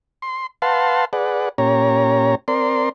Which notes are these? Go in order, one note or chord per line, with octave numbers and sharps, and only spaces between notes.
C6
B4 F5 F#5 A5 C6
G#4 B4 D5 F#5
A#2 C#4 G4 C#5 A#5
C4 A#4 D5 C6